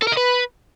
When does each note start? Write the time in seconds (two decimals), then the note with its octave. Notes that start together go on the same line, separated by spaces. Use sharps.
0.02 A4
0.07 A#4
0.12 D#5
0.17 B4